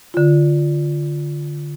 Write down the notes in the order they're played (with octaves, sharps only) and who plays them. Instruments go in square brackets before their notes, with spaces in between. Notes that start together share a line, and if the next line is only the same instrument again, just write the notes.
[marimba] D3 F4